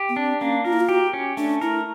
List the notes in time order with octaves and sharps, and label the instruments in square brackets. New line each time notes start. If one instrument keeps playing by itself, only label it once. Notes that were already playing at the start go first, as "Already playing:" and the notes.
Already playing: [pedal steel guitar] G4
[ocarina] B3
[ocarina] C4 [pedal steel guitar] D4
[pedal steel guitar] A#3 [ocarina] C#4
[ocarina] F4 [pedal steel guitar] A#4
[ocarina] E4
F4
[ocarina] F#4 [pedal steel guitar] G4
[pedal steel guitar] C#4
[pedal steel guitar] A3 [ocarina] D4
[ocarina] E4 [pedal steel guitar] A#4